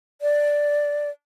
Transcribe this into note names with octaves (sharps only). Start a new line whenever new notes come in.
D5